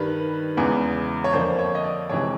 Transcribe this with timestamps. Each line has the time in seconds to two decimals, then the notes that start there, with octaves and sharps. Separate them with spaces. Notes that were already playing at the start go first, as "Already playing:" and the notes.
Already playing: G2 D#3 G3 B4
0.57 E2 C#3 E3 G#3 B3
1.24 C#5
1.33 F2 D3 F3 A#3 D4 C5
1.59 C#5
1.75 D#5
1.84 D5
2.09 F1 F2 C3 E3 G#3 C#5